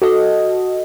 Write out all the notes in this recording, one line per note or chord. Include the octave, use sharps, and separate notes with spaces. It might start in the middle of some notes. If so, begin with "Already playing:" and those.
F#4 A4 D#5